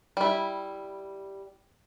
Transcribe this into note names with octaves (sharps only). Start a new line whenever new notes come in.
G3 E4